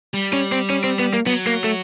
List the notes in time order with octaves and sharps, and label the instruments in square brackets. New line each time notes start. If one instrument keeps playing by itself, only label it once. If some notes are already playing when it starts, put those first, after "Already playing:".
[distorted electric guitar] G3
[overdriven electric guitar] C#4
C4
C#4
C4
B3
A#3
[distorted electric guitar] F#3 [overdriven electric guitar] B3
[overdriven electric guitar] A#3
A3